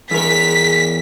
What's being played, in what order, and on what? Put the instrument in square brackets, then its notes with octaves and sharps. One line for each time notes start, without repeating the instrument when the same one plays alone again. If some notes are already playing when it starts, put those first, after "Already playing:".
[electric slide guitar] E2 A#4 [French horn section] G#4 [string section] B6